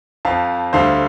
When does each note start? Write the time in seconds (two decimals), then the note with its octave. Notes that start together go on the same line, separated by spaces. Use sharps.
0.25 F2 F3 F5 A5
0.73 D2 D3 G3 C5 F5